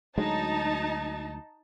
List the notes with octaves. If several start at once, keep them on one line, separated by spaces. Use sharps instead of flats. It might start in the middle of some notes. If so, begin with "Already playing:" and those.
D2 F#3 G#3 D#4 A5